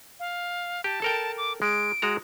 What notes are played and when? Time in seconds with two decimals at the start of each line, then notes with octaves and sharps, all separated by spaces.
0.20 F5
0.84 G4 A5
1.02 A4 A#4 G5
1.37 D6
1.62 G#3 D7
2.02 G#3 F#4 A#5